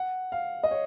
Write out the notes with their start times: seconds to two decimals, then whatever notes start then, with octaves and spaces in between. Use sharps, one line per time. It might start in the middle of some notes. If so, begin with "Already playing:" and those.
Already playing: F#5
0.32 F5
0.63 D#5
0.71 C#5